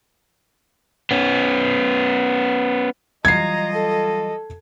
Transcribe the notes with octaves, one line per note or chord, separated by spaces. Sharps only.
B3 C#4
E3 F#3 G3 F4 D#5 A#5 G#6 C7
A4